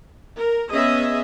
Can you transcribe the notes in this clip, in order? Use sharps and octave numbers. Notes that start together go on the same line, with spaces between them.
A#4
B3 C#4 G#4 D#5 E5